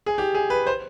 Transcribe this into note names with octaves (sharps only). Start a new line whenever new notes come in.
G#4
G4
G#4
B4
C5